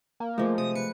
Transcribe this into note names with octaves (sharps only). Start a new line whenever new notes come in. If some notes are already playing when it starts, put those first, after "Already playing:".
A#3
F3 G#3 A3
C3 D#6
B4 C#7